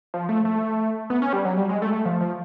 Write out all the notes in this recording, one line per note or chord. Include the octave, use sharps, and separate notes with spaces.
F3
A3
A3
B3
C#4
G3
F#3
G3
G#3
A3
A3
F3
F3